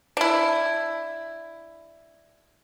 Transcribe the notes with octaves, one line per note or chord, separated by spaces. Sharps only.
D4 E4